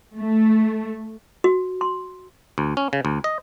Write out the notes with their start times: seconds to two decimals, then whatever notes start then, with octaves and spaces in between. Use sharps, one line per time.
0.17 A3
1.44 F#4
1.81 C6
2.58 D2
2.77 C#4
2.93 C#3
3.05 D2
3.24 D#5